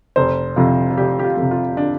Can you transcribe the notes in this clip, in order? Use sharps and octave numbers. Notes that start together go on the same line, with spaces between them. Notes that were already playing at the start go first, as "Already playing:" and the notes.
F1 C5
F2 C3 F4
F4
F1 G4
G4
F4
F2 C3
F4
D4